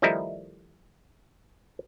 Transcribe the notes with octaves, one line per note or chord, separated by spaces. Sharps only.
D#3 F3 G3 A3 D#4 E4